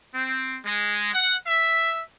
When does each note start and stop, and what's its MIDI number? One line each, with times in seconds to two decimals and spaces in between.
0.14 0.58 60
0.66 1.14 56
1.14 1.34 78
1.47 2.00 76